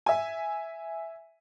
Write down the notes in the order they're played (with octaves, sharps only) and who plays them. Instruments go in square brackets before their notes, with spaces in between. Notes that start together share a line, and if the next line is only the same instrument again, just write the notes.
[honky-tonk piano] E5 G#5